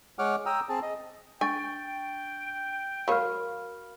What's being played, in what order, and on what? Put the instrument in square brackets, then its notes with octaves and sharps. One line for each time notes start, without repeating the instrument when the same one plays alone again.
[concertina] G#3 C#5 F#5 D6 F6
G5 A#5 D#6 E6
C4 G#4 A5
D#5
[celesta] D4 C#6 A6 [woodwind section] G5 [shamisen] G#5
[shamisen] F#3 C#5 [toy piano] F#4 A#4 F5 [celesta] B5 F6